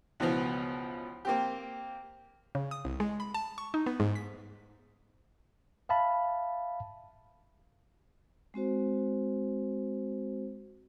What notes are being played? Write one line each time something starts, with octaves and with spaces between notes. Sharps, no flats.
C#2 B2 E3 F3 B3
A#3 C4 G4
C#3
D#6
C2
G#3
B5
A5
C#6
D#4
B3
G#2
B6
E5 F5 A5 B5
G#3 C4 F#4 C5